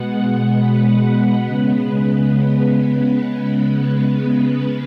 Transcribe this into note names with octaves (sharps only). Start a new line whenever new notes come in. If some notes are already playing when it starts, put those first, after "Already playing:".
Already playing: B2 G#3 B3 F#5
B4
C#3 G#3 B3